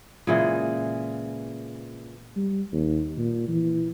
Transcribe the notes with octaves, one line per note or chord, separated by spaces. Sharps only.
A#2 C#3 E3 G#3
G3
D#2
A#2
E3